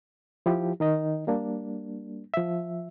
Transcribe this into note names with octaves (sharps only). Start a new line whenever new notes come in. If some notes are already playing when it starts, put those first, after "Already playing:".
F3 E4 G4
D#3 D#4 D#5
G3 A#3 D4
F3 E5